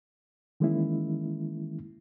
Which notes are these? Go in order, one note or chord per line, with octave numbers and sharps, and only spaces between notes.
D#3 E3 G#3 A#3 C#4 E4